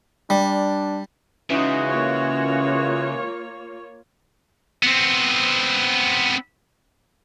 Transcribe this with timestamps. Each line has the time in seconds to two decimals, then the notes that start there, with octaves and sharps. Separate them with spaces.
0.30 G3 D4
1.50 C#3 E3 G#3 D#4 F#4
1.88 A#3 F4 C#5
4.83 B3 C4